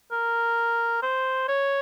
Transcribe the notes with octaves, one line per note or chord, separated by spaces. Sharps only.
A#4
C5
C#5